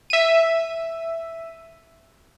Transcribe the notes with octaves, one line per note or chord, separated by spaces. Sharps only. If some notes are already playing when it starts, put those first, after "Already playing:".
E5 D#7